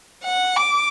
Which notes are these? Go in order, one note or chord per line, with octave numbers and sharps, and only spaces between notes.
F#5
D6